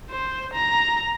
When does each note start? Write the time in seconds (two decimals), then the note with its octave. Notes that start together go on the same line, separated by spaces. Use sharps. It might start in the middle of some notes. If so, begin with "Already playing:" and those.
0.10 C5
0.54 A#5